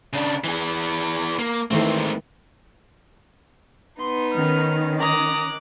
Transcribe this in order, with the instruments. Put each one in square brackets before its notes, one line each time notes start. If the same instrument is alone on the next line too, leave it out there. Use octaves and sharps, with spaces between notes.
[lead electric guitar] C#3 D4
E3 G#4
A#3
[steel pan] D#3 E3 A3 [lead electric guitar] G#3 C4
[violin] B3 D#4 [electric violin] C6
[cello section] D#3 C#4 [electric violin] F6
[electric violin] A#5 D#6 [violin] D6 F#6